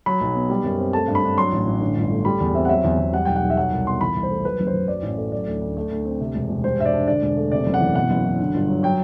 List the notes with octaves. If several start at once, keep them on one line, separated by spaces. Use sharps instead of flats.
F#3 B5
B1
B3
G3
F#2
C4
A3 A5
G2
B5
D4
F#3 C6
A1
A1
D3
G1
A3
G3 B5
E2
C4 E5
F#5
F#3 E5
E2
E2
G3 F#5
B1 G5
F#5
B1
E5
F#3 F#5
C2
B3 C6
E3 B5
C2
C5
A3
F#3 B4
F#1
C5
F#1
F#3 D5
A1
A3
F#3 D5
D2
D2
A3
D2
C4
C3
E1
E1
G3 C5
G2 E5
D5
D4
D3 D5
E1
A3
C3 D5
F#1
F#5
E3
B2 F#5
F#1
F#3
D3
G1
F#3
F#3 G5